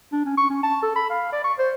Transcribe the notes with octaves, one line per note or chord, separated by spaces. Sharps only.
D4
C#4
C#6
C#4
A5
A4
B5
F5
D5
C#6
C5